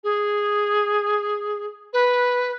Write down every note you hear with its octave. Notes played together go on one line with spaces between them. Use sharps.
G#4
B4